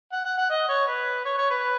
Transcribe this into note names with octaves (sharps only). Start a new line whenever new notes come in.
F#5
F#5
F#5
D#5
C#5
B4
C#5
C#5
B4